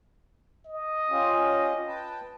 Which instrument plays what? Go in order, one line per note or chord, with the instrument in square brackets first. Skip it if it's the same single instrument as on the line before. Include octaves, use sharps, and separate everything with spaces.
[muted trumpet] D#5
[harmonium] C#4 F4 G4
B4 G5 A5